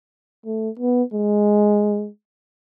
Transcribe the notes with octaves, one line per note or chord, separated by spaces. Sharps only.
A3
B3
G#3